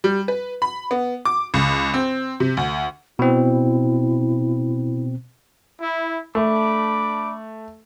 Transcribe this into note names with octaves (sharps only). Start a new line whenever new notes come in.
G3
B4
B5
B3
D6
C#2
C4
C3
D2
B2 C4 E4
E4
A3 D4 B5 D6